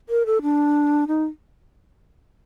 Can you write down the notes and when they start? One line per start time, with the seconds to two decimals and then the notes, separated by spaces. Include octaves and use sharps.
0.09 A#4
0.26 A4
0.42 D4
1.07 D#4